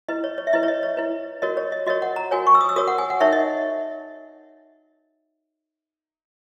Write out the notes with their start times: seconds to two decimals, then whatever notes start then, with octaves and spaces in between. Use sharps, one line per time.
0.08 E4 B4 D#5
0.24 C#5
0.38 C#5
0.47 E5
0.53 E4 B4 D#5
0.63 C#5
0.68 D#5
0.83 C#5
0.97 E4 B4
1.42 F#4 A#4 C#5 D#5
1.57 C#5
1.72 D#5
1.86 F#4 A#4 C#5 D#5
2.02 F#5
2.16 A#5
2.31 F#4 A#4 C#5 G#5
2.47 C#6
2.55 E6
2.61 D#6
2.69 E6
2.76 F#4 A#4 C#5 D#6
2.88 F#5
2.98 G#5
3.10 F#5
3.20 D#4 A#4 C#5 E5
3.33 D#5